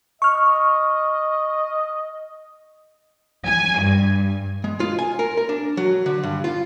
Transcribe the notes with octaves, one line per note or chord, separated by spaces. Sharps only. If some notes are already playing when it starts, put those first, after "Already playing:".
D#5 C#6 F6
G#5
G2
G#3
F4
G#5
A#4
A#4
D4
F#3
D3
G2
F4